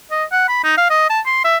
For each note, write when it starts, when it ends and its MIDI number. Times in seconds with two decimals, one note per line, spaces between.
0.11 0.24 75
0.32 0.47 78
0.48 0.62 83
0.64 0.77 63
0.77 0.90 77
0.90 1.06 75
1.10 1.20 81
1.26 1.41 84
1.44 1.57 76